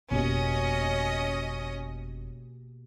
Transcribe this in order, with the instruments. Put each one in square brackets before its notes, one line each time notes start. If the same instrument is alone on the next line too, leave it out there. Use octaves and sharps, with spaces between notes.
[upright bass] F#1 F2 [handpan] B2 A#3 G4 [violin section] C#4 D#5